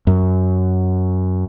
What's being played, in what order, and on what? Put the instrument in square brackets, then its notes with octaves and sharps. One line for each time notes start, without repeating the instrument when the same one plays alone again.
[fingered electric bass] F#2